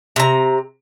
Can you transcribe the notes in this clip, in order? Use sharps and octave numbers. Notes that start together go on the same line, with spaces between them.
C3 A#5